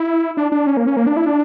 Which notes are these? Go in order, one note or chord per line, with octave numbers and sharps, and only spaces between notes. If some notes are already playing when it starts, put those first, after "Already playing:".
Already playing: E4
D4
D4
C#4
A#3
C#4
A#3
D4
E4
D4